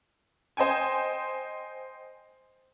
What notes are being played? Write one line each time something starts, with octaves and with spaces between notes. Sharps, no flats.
C5 D#5 G5 G#5